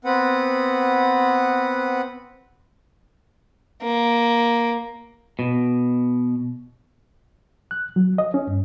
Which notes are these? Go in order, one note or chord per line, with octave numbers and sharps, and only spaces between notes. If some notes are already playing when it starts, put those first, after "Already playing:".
B3 C4 B4 F#5
A#3
B2
F#6
F#3
D#5
C#4
G2